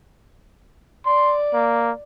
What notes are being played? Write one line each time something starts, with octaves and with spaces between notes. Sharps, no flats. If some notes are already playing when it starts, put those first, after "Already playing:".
D5 C6
A#3